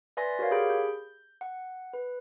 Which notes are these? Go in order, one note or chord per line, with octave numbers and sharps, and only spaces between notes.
B4 D5 E5 G#5 C6 A#6
F#4 A#4 C#5 F5
G4 G#4 B5 G6 D7
G6
F#5
B4